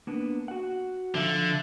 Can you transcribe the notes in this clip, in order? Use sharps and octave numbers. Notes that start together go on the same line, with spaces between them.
A#3 B3 D4
F#4 F#5
D3 F3 E5 F5